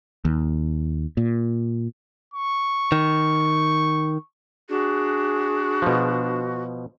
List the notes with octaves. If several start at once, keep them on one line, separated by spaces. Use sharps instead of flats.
D#2
A#2
C#6
D#3
D4 F#4 G#4
B2 F3